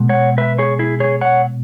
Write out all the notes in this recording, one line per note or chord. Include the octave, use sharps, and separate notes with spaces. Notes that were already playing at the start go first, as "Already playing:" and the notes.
Already playing: B2 G#3
C#5 F#5
B4 E5
G#4 C#5
E4 G#4
G#4 C#5
C#5 F#5